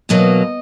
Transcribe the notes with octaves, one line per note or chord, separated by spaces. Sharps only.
E2 B2 F#3 A#3 D#5